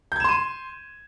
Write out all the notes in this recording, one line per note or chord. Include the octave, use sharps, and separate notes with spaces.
C6 G6 G#6 D#7 E7